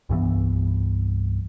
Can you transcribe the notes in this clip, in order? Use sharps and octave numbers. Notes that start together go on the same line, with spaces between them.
C2 G2 E3 B3